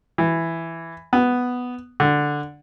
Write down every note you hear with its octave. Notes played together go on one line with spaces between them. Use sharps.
E3
B3
D3